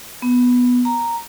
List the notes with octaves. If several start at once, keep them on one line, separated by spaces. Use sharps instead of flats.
B3
A#5